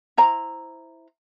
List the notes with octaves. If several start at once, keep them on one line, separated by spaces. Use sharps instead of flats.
E4 C5 A#5